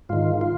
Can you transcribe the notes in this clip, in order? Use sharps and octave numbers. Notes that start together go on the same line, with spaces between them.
G#2 D#3 F4
F4